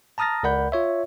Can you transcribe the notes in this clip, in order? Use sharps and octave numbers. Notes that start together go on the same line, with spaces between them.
A5 A#5 D#6 F6 A6 A#6
C#2 A#4 D5 F#5 B5 G6
F4 C#5 E5